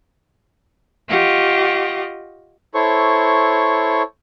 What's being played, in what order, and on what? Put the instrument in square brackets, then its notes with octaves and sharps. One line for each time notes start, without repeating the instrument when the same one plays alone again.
[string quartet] F4 G4 D#5 F#5 C#6
[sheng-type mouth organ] E4 A4 C5 C#5 C#6